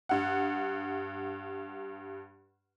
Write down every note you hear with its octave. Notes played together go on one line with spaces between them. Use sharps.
G2 F#5